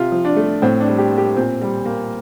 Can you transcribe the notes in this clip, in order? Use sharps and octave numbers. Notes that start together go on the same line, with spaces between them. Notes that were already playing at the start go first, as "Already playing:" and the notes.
Already playing: C3 F4
F3
D4
A3
A2 C4
D4
G3
G4
A#3
G4
A#2 C4
G3
A#3